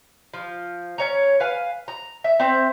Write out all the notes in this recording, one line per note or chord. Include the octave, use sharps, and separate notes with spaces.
F3
C#4 C#5 A#5
B4 F5 G#5
A#5
E5
C4 C5 E5